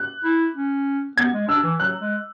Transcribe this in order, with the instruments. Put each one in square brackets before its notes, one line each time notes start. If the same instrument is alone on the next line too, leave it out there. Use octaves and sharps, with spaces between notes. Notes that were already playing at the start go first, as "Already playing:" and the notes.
Already playing: [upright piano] F#6
[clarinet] E4
C#4
[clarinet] B3 [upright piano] G#6
[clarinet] G#3
[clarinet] D4 [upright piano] E6
[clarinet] E3
[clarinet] F#3 [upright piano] F#6
[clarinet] G#3